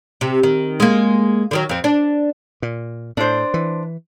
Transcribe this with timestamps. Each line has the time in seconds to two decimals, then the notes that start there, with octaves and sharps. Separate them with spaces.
0.21 C3
0.43 D#3
0.80 G#3 A#3
1.51 D3 D#3 F#3
1.69 F2 C4
1.84 D4
2.62 A#2
3.17 A2 D4 C5
3.54 E3